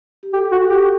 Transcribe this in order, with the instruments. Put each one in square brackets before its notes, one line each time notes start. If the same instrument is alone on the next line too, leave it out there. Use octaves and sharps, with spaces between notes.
[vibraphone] G4
[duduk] G4 [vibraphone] A4
[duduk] F#4
G4